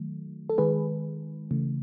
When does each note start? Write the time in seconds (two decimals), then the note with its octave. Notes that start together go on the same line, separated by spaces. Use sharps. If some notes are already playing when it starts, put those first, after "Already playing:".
Already playing: D#3 F#3 A3
0.50 A4
0.58 D#3 G#3 G#4 B4
1.51 C#3 E3 A3